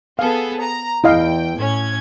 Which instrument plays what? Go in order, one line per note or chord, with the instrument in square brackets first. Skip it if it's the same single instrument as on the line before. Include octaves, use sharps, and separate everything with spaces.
[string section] B3 G#4 A4 [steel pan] F5
[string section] A#5
[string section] E2 G5 [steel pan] E4 D#5 F5
[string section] A2 C#4 G#6